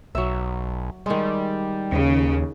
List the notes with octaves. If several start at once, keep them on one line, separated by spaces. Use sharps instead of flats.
B1 F#3 E5
D#3 G3 G#3
D#2 C#3